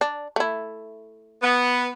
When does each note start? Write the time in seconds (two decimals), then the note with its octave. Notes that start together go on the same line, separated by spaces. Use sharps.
0.01 D4
0.36 A3 E4
1.42 B3